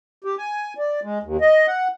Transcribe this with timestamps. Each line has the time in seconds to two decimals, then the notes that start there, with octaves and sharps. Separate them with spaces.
0.24 G4
0.38 G#5
0.78 D5
1.03 G#3
1.23 D#2
1.41 D#5
1.68 F#5